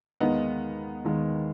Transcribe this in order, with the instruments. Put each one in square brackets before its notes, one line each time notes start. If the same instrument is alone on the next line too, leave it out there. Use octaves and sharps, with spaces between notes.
[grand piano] D#2 D#3 G#3 [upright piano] B3 D#4
[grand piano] D#2 D#3 G#3